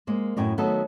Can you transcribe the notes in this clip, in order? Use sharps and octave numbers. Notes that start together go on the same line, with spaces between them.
G#3 A#3 C5
F#2 A2 C#5 G5
D#3 F#3 A3 B3 A4